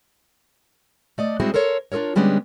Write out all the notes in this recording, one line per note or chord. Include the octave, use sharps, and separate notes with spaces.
A3 D5 D#5
G3 G#3 C4 E4 F#4 G#4
A4 A#4 C5 C#5
D4 F4 A4 A#4 C#5
D3 G3 G#3 B3 C#4 D4